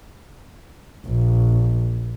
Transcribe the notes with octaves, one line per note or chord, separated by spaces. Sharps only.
A#1